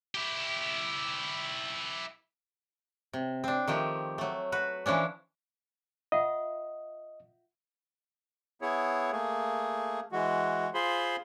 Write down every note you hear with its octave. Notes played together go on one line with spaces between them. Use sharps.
E4 G4
C3
C4 D4
D#3 F3 A3 G4
F#3 A3
F#4 B4
E3 F3 C#4 D4
F4 D#5 E5 F#5
B3 E4 G#4 C#5
A3 A#3 G#4
E3 G#3 F#4
F4 G#4 C5 B5 C6